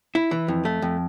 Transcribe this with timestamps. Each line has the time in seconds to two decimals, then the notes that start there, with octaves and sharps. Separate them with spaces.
0.15 E4
0.31 E3
0.48 F2
0.65 A3
0.82 F2